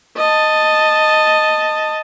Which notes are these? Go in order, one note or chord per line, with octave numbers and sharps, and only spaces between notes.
D#5 A5